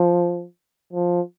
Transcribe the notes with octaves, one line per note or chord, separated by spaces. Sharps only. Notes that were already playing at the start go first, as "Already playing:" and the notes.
Already playing: F3
F3